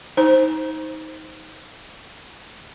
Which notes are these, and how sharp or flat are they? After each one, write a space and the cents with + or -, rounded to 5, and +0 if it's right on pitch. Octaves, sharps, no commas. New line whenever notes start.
D#4 +20 C5 +0